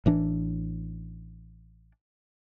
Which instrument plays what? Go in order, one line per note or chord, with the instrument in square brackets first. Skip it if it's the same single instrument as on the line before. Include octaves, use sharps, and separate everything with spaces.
[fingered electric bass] A1 E3 D4